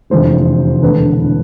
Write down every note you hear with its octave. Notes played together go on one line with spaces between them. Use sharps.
F1 E2 D3 F3 G#3 C5
E1 D2 D3 A3 B4